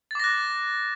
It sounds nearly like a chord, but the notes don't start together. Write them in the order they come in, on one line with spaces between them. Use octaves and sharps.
A6 D6 A#6 F#6